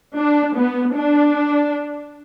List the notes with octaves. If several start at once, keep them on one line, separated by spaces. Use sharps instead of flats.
D4
B3
D4